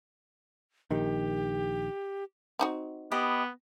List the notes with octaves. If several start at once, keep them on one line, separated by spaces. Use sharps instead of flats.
A#1 D#3 G4
C4 D#4 F#4
B3 G4 D#5 B5